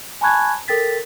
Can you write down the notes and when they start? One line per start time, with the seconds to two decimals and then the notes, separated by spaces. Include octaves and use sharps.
0.21 G#5 A5 B5 C#6 F#6 G#6
0.68 A4 A#4 G5 A6 B6